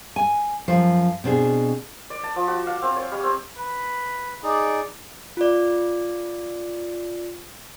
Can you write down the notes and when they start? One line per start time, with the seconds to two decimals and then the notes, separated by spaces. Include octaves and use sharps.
0.16 G#5
0.68 F#2 F3 C5
1.24 B2 C4 D4 G#4
2.10 D5
2.23 A5
2.36 F3
2.48 F#4
2.67 F5
2.82 C4
2.96 C#5
3.12 G3
3.23 C4
3.56 B4 B5
4.43 D#4 G#4 D5
5.37 F4 D5